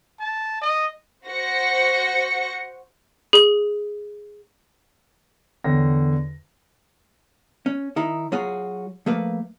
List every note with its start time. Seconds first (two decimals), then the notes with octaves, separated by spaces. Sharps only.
0.19 A5
0.62 D#5
1.26 F#4 C5 A#6 C#7
3.33 G#4 F#7
5.64 E2 D3 C#5 G5 A#6
7.66 C#4
7.96 D#3 D#4 E4
8.32 F#3 F4 F#4 G#4
9.06 F3 A3 A#3 B4